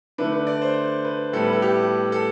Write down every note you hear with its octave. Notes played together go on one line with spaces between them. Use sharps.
D3 A3 D4 B4
B4
D5
C5
B4
A2 G3 B3 A4
B4
A4
G4
A4